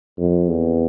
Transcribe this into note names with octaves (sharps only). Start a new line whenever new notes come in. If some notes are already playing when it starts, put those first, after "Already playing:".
F2
E2